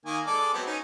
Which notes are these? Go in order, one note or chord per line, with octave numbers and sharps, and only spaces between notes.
D#3 A#3 G#5
G#3 A4 D5
F#3 B3 C4
C#4 D#4